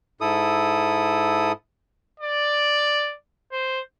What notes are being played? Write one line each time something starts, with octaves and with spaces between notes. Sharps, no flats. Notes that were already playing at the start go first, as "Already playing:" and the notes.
G#2 E4 A4 D#6
D5
C5